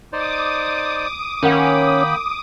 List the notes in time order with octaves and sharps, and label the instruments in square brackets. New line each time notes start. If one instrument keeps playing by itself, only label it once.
[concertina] D#4 C5 D5 [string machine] D6 D#6
[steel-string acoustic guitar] D#3 F#5 [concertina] A#3 G5 B5 [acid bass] C#4